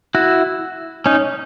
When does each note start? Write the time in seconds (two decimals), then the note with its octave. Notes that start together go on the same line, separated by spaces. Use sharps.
0.15 E4 F#4
1.06 C#4 D#4